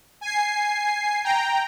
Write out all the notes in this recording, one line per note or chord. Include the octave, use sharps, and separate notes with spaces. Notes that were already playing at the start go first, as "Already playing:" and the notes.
G#5 C7
G5 A#5